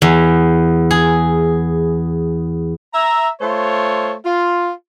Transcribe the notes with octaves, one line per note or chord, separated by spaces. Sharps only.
E2
G#4
E5 A#5
A3 F4 C5 C#5
F4